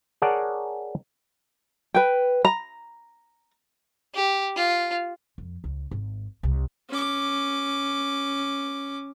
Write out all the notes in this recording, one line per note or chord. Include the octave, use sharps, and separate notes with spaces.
G#4 A#4 C#5 D5 F#5 A5
B4 G5
A#5
G4
F4
F2
C#2
G#1
C2
C#4 D6